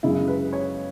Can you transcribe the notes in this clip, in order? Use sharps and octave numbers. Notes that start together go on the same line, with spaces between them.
F#2 C#3 G#3 E4
B4
C#5